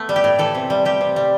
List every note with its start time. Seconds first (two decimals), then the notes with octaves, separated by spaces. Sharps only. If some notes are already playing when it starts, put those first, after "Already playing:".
Already playing: A3 B3
0.09 G3
0.16 G4
0.24 A2
0.39 E3 A4
0.55 C3
0.70 G3
0.85 G3 G4
1.01 C3
1.16 G3